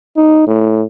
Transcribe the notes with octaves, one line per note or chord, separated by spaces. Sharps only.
D#4
A2